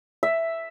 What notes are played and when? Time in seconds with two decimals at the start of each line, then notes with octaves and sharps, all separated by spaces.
0.23 E5